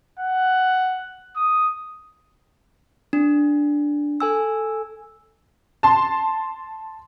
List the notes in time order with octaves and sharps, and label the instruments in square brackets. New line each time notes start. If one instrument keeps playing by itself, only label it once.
[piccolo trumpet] F#5
D#6
[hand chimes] D4
A4 G#5 E6
[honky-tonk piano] A5 C6